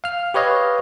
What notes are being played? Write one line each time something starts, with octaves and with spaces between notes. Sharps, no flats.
F5 F6
G4 B4 C#5 D#5 F5